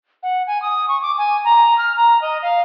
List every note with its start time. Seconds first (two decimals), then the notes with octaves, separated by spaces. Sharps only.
0.23 F#5
0.47 G#5
0.62 D#6
0.88 C#6
1.02 D6
1.18 G#5
1.45 A#5
1.78 F6
1.97 A#5
2.22 D#5
2.42 F5